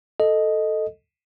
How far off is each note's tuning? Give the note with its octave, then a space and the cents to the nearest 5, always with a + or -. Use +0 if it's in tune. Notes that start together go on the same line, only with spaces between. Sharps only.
A4 +0 D#5 +0